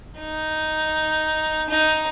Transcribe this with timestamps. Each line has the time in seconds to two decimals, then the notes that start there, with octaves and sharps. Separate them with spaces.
0.19 D#4
1.69 D#4